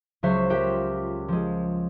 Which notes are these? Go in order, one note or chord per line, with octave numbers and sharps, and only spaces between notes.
C#2 F#3 C5 E5 C#6
F4 G4 A#4 E5 F#5 G5
F3 G#3